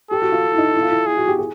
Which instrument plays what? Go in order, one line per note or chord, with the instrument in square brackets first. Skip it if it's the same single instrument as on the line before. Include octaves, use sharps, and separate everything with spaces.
[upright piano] G4 [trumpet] A4
[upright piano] F#4
F4
E4
D#4
E4
F4
E4
[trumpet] G#4
[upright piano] F#4
G4
G#4